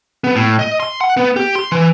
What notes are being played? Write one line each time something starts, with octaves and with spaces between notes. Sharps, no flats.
B3
A2
D#5
C6
F#5
B3
G4
C6
E3